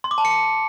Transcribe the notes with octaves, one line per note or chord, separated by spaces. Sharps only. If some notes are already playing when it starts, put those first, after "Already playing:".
C6
D6
A5
C#7